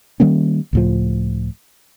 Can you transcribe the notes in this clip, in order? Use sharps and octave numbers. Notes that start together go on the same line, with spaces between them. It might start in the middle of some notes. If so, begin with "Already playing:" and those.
D#3 G3 A#3 C#4
C#2 A2 F3